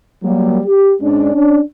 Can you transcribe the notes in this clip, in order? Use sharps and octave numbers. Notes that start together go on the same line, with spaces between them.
F#3 G3 A#3
G4
G#2 G#3 C#4 D4
C#4 D4